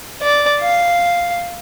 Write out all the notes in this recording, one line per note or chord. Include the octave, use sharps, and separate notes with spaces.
D5
F5